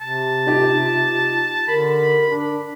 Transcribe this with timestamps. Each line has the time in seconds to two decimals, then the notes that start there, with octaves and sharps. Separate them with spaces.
0.01 C3 A5
0.47 D#4 F4 G4
1.68 D3 A#4 B5
2.27 D4